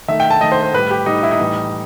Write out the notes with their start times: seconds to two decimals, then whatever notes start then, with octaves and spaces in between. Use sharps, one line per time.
0.08 D#3 A3 E5
0.20 G5
0.31 A5
0.41 D#3 A3 D#5
0.52 C5
0.63 C5
0.73 A2 G3 B4
0.91 G4
1.06 A2 G3 D#4
1.23 E4
1.31 D#4
1.39 A2 E3 G3